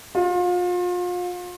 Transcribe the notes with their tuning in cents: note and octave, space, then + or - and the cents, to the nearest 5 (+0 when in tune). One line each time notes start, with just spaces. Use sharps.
F4 +35